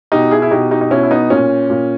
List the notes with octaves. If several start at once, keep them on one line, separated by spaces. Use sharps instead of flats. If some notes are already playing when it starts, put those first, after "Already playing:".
B2 D#4 G4
E4 G#4
E4
B2 D#4 G4
D#4 G4
D#4
B2 C#4 E4
E4
B3 D#4
A#2 C#4
A#2